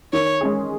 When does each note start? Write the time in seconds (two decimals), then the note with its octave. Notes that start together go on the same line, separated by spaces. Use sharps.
0.13 D#3 C#5
0.41 G#3 C#4 G#4